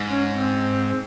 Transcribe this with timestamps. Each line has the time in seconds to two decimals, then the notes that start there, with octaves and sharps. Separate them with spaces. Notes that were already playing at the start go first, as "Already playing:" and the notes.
Already playing: G#2
0.10 C#4
0.30 C4